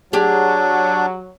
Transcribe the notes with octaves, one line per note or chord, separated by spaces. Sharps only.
F#3 D4 G4 G#4